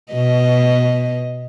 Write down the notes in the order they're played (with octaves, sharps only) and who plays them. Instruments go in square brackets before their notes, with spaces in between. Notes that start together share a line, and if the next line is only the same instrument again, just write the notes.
[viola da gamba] B2 B3 D#5